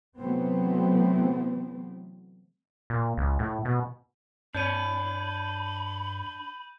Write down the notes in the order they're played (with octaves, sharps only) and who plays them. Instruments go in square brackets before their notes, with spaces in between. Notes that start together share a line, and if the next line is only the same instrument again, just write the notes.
[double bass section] C3 E3 F#3 A3 B3 C4
[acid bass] A#2
C#2
A2
B2
[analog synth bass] G2 [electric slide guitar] D4 C#5 [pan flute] B5 [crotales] G6 D#7